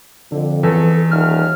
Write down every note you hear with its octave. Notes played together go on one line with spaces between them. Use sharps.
F2 D3
E2 A4
D#1 F6